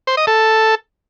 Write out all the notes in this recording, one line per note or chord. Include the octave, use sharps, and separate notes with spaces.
C5
D#5
A4